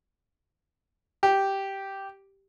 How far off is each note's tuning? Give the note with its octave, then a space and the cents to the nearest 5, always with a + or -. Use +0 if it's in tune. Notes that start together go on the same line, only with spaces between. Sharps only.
G4 -5